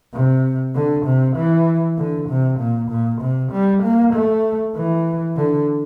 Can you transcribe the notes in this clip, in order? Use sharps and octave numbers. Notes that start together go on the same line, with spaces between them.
C3
D3
C3
E3
D3
C3
A#2
A#2
C3
G3
A#3
A3
E3
D3